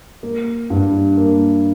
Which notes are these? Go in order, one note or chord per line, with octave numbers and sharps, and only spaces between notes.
A#3
G2
A#3